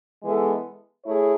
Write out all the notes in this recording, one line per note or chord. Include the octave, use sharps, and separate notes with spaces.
E3 G#3 B3 E4 A4
A3 E4 G#4 C#5